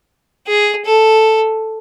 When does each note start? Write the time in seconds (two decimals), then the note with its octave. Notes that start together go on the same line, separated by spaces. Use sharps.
0.47 G#4
0.85 A4